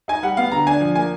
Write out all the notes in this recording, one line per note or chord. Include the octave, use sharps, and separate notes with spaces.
D#4 G#5
G3 F#5
B3 F5
D3 A#5
D4 G#5
F3
A#3 G#5